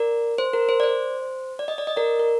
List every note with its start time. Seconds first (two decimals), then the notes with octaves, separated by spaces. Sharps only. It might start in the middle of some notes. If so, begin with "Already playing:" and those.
Already playing: A#4 D5
0.38 C5
0.53 A#4
0.69 C5
0.80 D5
0.83 C5
1.59 D5
1.68 D#5
1.78 D5
1.87 D#5
1.96 A#4 D5
2.20 A#4